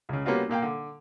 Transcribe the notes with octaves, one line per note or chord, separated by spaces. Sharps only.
C#2 C#3
G3 A#3 B3 C#4 F4 F#4
A#2 A#3 F5 G5
D3